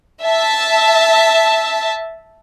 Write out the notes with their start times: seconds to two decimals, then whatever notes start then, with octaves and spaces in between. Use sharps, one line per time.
0.23 E5 A5